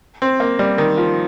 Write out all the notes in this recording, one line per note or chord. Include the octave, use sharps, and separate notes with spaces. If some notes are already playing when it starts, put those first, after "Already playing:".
C4
A#3
G3
D#3
F3